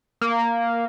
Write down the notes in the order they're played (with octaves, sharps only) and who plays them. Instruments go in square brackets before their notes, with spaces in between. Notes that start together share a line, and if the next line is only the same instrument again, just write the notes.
[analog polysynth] A#3